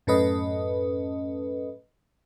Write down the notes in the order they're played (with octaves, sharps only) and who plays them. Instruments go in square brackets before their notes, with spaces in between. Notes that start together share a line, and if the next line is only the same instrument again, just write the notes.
[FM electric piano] F#2 A2 C#4 A4 B4 D#5